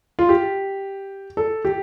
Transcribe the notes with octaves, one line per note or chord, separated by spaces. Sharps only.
F4
G4
A4
G4